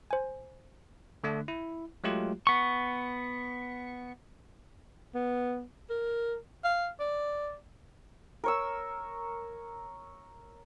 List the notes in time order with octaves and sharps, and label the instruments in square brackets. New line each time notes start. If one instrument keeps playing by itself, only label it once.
[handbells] C5 G#5
[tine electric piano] D3 A3 D4
E4
F#3 G#3 A3 F4 G4
[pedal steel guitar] B3 C#6
[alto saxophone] B3
A#4
F5
D5
[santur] A#4 C#5 E6